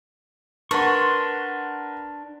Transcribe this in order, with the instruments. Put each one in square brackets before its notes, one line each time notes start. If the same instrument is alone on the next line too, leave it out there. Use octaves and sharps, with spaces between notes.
[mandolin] D4 [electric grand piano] A#4 B4 F#5 [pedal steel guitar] C6 C#6